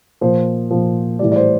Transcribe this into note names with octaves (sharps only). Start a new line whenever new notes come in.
A#2 F3 C5
A#2 F3
A2 E3 G3 D5
D5
C5